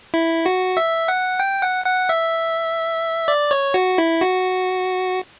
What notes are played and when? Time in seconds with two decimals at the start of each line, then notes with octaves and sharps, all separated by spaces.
0.14 E4
0.46 F#4
0.77 E5
1.08 F#5
1.40 G5
1.62 F#5
1.86 F#5
2.09 E5
3.28 D5
3.51 C#5
3.74 F#4
3.98 E4
4.21 F#4